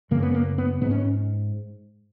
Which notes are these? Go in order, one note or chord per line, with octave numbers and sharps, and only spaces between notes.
F#2 C#3 A#3
B3
A#3
B3
G#2 B3
C#4